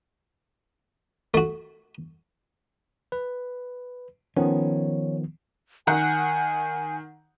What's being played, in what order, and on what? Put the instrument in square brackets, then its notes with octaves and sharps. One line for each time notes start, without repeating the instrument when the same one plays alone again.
[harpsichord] A3 F#4
[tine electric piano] B4
[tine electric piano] D#3 F3 B3 [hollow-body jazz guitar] C#4
[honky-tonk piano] D#3 F#5 [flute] G#5